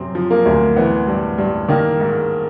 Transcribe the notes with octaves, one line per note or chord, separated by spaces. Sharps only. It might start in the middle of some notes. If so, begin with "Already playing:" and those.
Already playing: F#2 C3 C4
F3
A#3
D2
E3 B3
G2
G2
D#3 A#3
G#2